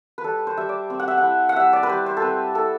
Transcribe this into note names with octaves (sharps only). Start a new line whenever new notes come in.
B4
G3 A4
C5
G3 E5
D5
C4
F#5
E5
F#5
E4
F#5
G3 E5
D5
B4
G3 C5
C5
A4
C4 B4
E4 A4